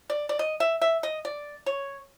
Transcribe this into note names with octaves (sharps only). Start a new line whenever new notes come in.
D5
D5
D#5
E5
E5
D#5
D5
C#5